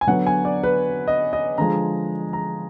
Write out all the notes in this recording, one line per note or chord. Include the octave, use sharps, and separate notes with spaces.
G#5
D3 F#3 B3 F#5
G#5
D5
B4
D#5
D#5
D3 F3 G#3 A#5
A#5